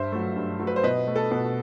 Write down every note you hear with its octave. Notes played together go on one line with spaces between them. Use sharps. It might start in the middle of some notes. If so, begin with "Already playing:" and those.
Already playing: G2 C5 E5
F#3 A3
G2
F#3 A3
B4
C5
B2 B4 D#5
A3
A4
B2 B4